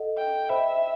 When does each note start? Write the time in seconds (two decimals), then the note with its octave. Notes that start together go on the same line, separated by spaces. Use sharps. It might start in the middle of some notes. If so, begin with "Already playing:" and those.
Already playing: A4 D#5 F#5
0.18 G5
0.49 C5 D#5 E5 G5 B5